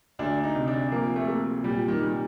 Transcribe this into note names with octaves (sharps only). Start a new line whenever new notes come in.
D2 D4
D#4
C3
D4
F3 A#3
A3
A#3
A#2 G3
D#3
G3